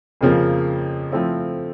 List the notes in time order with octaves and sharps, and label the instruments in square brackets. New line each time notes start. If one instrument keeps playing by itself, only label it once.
[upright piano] F2 C#3 F3 A#3
F3 A3 C4 E4 A4